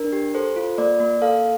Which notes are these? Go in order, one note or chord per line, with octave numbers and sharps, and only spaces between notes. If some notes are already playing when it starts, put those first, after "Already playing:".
Already playing: D4 A#4
G4
A4 C5
F4
A#3 D5
A#3
A4 F5